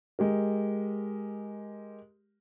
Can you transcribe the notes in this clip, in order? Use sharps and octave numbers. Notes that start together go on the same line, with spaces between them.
G#3 G4 A#4